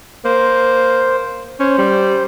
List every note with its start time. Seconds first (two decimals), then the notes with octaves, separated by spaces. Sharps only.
0.25 A#3 C5
1.60 C#4 C5
1.78 G3